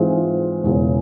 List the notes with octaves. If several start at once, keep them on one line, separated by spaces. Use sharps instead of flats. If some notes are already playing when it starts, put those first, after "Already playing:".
Already playing: G#2 E3 G#3 C4 F4
E1 E2 C#3